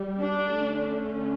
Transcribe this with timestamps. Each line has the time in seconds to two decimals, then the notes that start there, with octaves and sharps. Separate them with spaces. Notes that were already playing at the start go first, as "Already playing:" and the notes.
Already playing: G3
0.20 D4
0.52 D3 A3 C#4